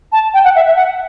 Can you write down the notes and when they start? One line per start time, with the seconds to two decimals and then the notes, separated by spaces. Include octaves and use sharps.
0.12 A5
0.34 G5
0.44 F#5
0.56 E5
0.66 E5
0.76 F#5